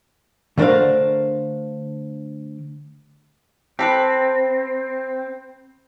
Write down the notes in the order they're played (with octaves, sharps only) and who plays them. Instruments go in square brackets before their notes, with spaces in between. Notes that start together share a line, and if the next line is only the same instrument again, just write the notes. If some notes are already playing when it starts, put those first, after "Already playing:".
[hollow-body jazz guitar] D3 A3 D4 A#4 C5 F5
[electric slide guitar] C4 [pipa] G4 A4 B4